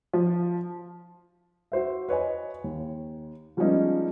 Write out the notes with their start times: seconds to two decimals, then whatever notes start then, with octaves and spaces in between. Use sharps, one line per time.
0.13 F3
1.72 F#4 C5 E5
2.09 B4 C#5 D#5 G#5
2.64 D#2
3.57 F3 G3 G#3 B3 C#4 D#4